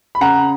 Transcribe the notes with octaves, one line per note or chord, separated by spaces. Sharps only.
B5
C#3 F#5 A#5